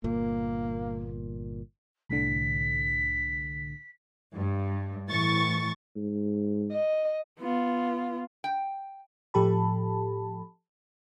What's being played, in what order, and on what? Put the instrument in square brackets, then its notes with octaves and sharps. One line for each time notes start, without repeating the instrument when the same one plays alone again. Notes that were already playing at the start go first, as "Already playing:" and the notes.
[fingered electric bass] G1 A#2 [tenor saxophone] A#3
[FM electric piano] C2 A2 D3 [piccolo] B6
[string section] G2
A2 E3 C#6 A6
[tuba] G#2
[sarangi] D#5
[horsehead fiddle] B3 F4
[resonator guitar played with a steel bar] G5
[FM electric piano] A2 F3 G4 A4 A5 B5